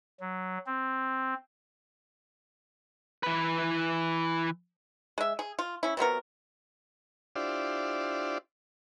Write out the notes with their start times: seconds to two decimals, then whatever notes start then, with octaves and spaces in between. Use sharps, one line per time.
0.20 F#3
0.66 C4
3.23 E3 B4
5.18 G#3 E5
5.39 G#4
5.59 F4
5.83 C#4 E4
5.97 C3 F#3 B3 A#4
7.36 D4 E4 F4 G4 C5 D5